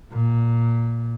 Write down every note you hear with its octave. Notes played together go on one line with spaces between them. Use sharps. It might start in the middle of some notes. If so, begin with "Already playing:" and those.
A#2